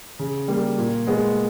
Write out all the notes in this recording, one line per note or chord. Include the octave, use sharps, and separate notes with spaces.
C#3
G3 A#3
A#2
G#3 B3